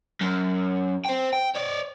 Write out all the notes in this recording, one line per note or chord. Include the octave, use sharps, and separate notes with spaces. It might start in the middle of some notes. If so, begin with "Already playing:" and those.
F#2
C5 G5
G5
C#5 D5